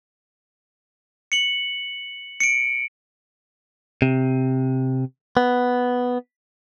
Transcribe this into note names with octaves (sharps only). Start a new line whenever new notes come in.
C#7 F#7
C#7 D7
C3
B3